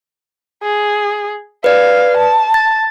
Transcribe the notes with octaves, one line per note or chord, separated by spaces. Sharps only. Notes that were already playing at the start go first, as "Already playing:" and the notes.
G#4
B4 D5 F5
A5
A6